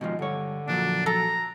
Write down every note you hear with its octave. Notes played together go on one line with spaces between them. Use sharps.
B2 D#3 F3 G#3
G2 D3 C#5
A#2 F3 F#3 D4
A4 A#5